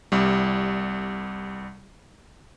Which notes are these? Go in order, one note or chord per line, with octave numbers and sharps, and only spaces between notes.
C2 G3